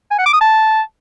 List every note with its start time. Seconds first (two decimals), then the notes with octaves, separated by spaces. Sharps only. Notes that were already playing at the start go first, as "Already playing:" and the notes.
0.11 G#5
0.18 F#5
0.26 D6
0.33 D#6
0.41 A5